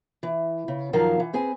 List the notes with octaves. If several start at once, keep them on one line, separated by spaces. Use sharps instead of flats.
E3
C#3
F#2 D#3 F3 A#4 F5 A5
E3
C4 G#4 B4 G#5